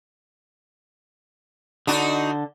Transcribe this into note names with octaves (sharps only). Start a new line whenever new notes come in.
D3 D4 D#4 F#4